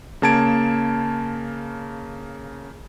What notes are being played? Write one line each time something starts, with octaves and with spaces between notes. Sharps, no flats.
C#3 A#3 A5 G#6 D7